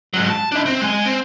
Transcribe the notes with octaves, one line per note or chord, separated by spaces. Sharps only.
G#2 F#3
A5
D4 E4
C4
G#3 G#5
C4